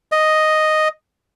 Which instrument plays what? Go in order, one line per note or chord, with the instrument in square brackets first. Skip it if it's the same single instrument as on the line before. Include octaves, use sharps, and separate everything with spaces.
[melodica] D#5